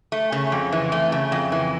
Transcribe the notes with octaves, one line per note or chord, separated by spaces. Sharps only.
A3
C#3
F2
E3
A3
C#3
F2
E3